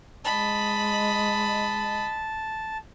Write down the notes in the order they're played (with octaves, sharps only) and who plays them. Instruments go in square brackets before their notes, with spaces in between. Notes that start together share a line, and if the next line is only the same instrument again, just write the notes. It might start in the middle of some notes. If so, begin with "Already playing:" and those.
[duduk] G#3 [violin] D#5 B5 [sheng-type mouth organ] A5